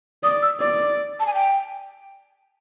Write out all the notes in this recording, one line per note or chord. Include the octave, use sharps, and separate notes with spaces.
D5 D#6
E6
D5
A5
G#5
G5